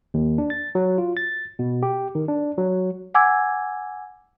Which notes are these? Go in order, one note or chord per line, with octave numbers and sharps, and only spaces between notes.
D#2
D4
A6
F#3
F4
A6
B2
G4
D#3
D4
F#3
F#5 G#5 D6 E6 G#6